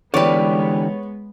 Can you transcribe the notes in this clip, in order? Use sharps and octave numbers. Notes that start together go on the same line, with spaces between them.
D3 E3 G#3 B3 G4 B4 C#5 D5